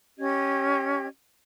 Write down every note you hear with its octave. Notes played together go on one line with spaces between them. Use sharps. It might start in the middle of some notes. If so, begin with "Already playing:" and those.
C#4 G4 D#5 G#6